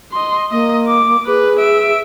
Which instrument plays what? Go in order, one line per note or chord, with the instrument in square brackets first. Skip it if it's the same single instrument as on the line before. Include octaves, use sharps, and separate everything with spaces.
[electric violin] D#5 C6
[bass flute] A#3 [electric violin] D#5
[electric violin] D6
[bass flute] G#4 [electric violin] B4
[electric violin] E5 D7